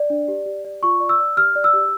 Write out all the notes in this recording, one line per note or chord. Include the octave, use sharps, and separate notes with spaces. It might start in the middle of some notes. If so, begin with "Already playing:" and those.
Already playing: D5
D4
G4
G4
D5
F4 C#6
D5
E6
D5
G4 F6
D5
E6
G4